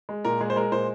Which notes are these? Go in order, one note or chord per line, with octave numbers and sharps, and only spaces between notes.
G#3
A#2 A#4
G#3 G#4
C5
G#3 A#4
A#2 C5